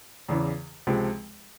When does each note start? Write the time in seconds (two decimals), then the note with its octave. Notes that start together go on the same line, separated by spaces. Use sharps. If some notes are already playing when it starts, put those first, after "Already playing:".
0.29 E2 C#3 E3
0.87 C#2 C3 F3 G#3